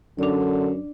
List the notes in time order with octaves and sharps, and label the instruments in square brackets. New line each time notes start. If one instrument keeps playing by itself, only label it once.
[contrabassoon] F#2 [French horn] D3 [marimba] D4 D5